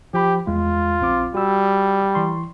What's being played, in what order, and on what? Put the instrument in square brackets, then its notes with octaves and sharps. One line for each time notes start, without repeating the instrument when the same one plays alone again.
[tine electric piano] F3 B5 [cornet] G4
[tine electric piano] E2 G#3 [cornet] F4
[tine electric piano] A#1 C4 D6
[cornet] G3 [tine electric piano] F#4 E6
[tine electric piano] E3 C6 C#6